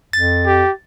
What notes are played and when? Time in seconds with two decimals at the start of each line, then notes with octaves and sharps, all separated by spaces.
0.13 F2 A6
0.46 G4